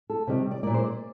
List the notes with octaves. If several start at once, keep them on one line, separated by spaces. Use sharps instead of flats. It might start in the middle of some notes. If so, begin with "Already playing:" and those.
A4
C3 D#3 G3
D5
A#2 G3 A#3 D5
C5
D5